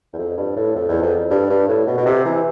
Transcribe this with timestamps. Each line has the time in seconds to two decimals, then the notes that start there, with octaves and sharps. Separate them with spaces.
0.13 E2
0.18 F2
0.37 G2
0.56 A2
0.75 F2
0.89 E2
1.02 F2
1.30 G2
1.50 G2
1.68 A2
1.87 B2
1.97 B2
2.06 C3
2.25 E3